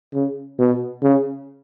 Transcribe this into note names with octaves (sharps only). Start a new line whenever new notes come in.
C#3
B2
C#3